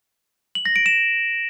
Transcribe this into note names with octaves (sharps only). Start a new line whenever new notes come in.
F#7
A#6
D7
E7